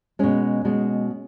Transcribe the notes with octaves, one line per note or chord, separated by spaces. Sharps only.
B2 G#3 C#4
B2 G#3